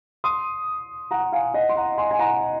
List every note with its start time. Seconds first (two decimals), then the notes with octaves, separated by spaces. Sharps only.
0.24 C6 D#6
1.11 F#5 A#5
1.32 F5 G#5
1.54 D#5 F#5
1.69 C6
1.76 F#5 A#5
1.98 G#5 C6
2.11 G#5
2.19 F#5 A#5